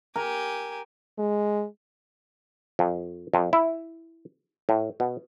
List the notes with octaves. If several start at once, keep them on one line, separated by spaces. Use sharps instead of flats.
G4 A#4 G#5
G#3
F2
F2
E4
A2
B2